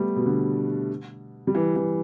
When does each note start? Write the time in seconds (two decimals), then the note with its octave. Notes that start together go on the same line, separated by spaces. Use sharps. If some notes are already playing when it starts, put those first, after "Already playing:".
Already playing: G3 A3 B3
0.16 B2
0.26 D3
1.47 G3
1.55 E3
1.76 E3